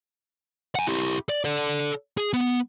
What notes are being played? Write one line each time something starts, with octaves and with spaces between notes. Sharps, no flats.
F#5 G#5
E4 G4
D5
A4 D5
G#4
B3